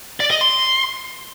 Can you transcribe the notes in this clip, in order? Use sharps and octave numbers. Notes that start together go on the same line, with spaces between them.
D5
D#5
C6